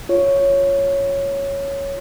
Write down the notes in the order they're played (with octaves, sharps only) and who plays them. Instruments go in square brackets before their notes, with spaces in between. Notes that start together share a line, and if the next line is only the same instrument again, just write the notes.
[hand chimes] F4 C#5